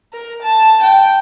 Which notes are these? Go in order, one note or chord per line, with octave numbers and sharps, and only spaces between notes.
A#4
A5
G5